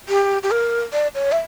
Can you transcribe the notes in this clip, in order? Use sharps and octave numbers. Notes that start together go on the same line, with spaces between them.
G4
G4
A#4
D5
C#5
E5